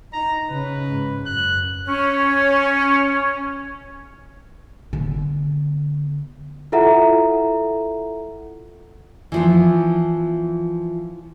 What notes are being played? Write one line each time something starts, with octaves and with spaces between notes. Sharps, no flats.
D#4 A#5
C#3 C#4 B4
G#2
F#2 F#6
C#4 C#5
D3 B3
E4 F4 A4 E5 F#5 A#5
E3 F3 B3